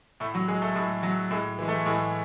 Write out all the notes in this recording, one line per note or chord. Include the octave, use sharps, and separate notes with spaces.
A2 A3
F#3 F#4
F#3 G#3 G#4
A3 A4
A2 G#3 G#4
F#3 F#4
A2 G#3 G#4
E3 G#3
A3 A4
A2 G#3 G#4